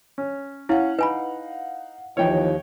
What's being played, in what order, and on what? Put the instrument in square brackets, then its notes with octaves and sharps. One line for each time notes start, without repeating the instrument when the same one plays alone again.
[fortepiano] C#4
[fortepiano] C#4 [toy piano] E4 [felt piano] F5 F#5
[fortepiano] D#4 [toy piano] B4 G#5 B5
[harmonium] D#2 [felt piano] E3 F3 D#4 [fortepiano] C#5 G5